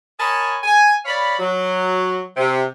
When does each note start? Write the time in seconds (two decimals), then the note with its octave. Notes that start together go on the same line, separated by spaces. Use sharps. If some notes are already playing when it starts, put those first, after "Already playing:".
0.19 A#4 C#5 D#5 G#5 A5 B5
0.64 G#5
1.05 C#5 D5 F5 B5
1.39 F#3
2.37 C3